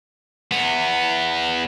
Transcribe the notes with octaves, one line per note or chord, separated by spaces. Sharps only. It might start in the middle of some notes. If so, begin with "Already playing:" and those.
E2 B3